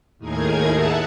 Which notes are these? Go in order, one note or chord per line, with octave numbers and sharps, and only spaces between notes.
D#2 A2 D#4 G#4 A#4 G#6
E5 F#5 A5 A#5 F#6